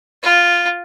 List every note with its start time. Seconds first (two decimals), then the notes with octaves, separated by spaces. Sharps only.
0.23 F4